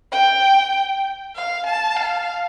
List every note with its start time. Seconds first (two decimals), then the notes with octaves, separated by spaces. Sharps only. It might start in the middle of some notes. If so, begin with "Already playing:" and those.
0.12 G5
1.35 F5
1.67 A5
1.97 F5